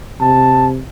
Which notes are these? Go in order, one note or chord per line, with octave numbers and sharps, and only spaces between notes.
C3 A5